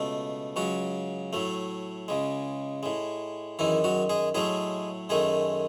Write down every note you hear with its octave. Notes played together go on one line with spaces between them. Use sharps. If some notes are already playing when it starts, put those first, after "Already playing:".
Already playing: C#2 B2 A3
C#2 C#3 F#3 F#4
A2 F#3 A3
C#2 C#3 G#3
A2 G#3
F#2 D#3 E3 G#3 E4
F#3 F#4
G#3 G#4
A2 F#3 G#3 A3 G#4
F#2 D#3 G#3 A3 G#4